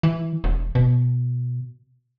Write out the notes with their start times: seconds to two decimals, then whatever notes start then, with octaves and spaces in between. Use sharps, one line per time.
0.03 E3
0.44 E1
0.75 B2